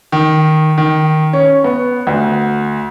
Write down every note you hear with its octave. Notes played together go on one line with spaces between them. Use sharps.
D#3
D#3
C#4
B3
D2